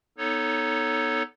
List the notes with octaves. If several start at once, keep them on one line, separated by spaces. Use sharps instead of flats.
B3 D#4 A4 C#5